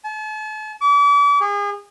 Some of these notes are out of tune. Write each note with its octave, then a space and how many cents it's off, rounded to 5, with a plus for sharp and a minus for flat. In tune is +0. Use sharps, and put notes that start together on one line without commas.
A5 -40
D6 -40
G#4 -35